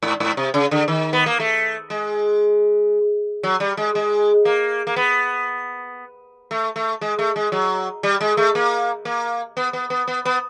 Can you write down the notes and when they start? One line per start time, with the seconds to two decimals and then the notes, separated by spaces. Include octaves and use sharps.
0.03 G#2
0.20 G#2
0.37 C3
0.54 C#3
0.71 D3
0.88 D#3
1.13 B3
1.26 A#3
1.40 A3
1.90 G#3
3.43 F#3
3.60 G3
3.77 G#3
3.95 G#3
4.45 A#3
4.87 A#3
4.96 B3
6.51 A3
6.76 A3
7.01 G#3
7.19 A3
7.36 G#3
7.52 F#3
8.03 G3
8.21 G#3
8.37 A3
8.55 A#3
9.05 A#3
9.57 B3
9.73 B3
9.90 B3
10.08 B3
10.25 B3